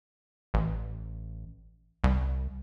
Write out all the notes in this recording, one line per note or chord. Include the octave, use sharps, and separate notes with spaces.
A1
C2